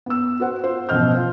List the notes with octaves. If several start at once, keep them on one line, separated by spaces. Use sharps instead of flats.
B3 E6
F#4 B4 C5 F#5
F4 C5
A1 B2 F3 D#5 F6 G6
F4 C5